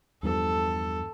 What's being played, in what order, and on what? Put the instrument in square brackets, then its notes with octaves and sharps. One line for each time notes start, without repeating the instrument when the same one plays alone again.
[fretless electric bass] E2 G2 F3 [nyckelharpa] A4